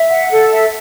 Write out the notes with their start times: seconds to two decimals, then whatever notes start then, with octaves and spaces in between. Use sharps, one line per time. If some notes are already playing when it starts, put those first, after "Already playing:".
Already playing: E5
0.11 F#5
0.31 A4
0.51 E5